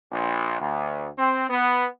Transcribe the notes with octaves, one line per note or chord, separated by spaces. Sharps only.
A#1
D2
C4
B3